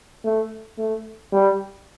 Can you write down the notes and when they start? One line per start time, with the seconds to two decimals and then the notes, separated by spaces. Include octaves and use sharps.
0.24 A3
0.78 A3
1.33 G3